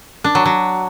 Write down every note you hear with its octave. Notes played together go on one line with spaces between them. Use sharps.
D4
F#3
F#3